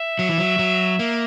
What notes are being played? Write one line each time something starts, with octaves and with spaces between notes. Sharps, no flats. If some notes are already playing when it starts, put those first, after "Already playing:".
Already playing: E5
F#3
E3
F#3
F#3
A#3